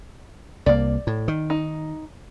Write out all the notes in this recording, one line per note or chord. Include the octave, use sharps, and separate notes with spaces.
C2 A#3 D5
A2
D#3
D#4